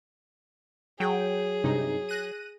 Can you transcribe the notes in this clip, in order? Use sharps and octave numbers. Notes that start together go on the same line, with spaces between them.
F#3 G#4 G5
G2 C3 D#4
F#6 A#6 D#7